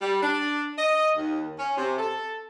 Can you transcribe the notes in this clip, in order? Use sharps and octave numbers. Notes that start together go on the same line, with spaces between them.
G3
D4
D#5
D#2
C#4
C3
A4